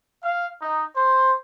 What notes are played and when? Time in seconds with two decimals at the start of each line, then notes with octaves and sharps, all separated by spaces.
0.22 F5
0.61 D#4
0.95 C5